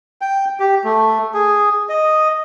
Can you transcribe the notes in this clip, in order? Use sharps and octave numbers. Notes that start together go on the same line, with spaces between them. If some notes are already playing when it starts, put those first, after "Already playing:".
G5
G4
A3
G#4
D#5